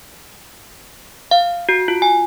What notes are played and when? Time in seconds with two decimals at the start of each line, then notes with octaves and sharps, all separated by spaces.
1.31 F5
1.69 F#4
1.88 F4
2.02 G#5